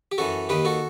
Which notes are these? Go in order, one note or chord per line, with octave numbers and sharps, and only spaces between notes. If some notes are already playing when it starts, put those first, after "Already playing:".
G4
F#2 E3 F#4 A4
D#2 D#3 G4 B4
F#4 A4